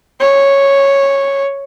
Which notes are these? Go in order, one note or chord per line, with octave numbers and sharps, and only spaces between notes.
C#5